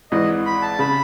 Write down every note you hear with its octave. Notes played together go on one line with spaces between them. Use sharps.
G#1 G#2 E3 D#5
B5
A5
C#3 B5